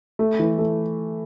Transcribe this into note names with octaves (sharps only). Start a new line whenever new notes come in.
A3
E3
A3